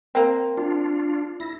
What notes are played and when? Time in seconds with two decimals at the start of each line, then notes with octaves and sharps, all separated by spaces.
0.15 A#3 C4
0.58 D4 F4
1.40 E4 A#6